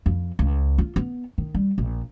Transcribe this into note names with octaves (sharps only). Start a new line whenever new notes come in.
F2
C#2
F4
B3
D#3
G3
A#1